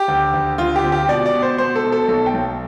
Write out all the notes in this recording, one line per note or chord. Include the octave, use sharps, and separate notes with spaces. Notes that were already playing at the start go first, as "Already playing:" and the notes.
Already playing: G4
D2
D2
D2 F4
G4
C4
G4
B2 D5
D5
B2
C5
B2 C5
A4
B2
A4
B1 A4
G5
B1